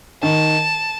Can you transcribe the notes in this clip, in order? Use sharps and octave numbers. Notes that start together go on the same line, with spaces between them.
D#3 A5